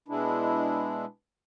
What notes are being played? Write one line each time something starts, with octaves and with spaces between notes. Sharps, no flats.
B2 G#3 D4 E4